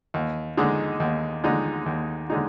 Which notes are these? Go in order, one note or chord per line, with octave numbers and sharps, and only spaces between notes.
D#2
D3 G#3 D#4
D#2
D3 G#3 D#4
D#2
D3 G#3 D#4